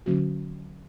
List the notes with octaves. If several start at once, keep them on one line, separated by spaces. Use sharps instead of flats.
D3 F#3 A#3 C#4 F#4